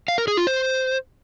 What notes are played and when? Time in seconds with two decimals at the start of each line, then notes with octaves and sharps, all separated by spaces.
0.08 F5
0.18 A#4
0.28 G#4
0.37 F4
0.47 C5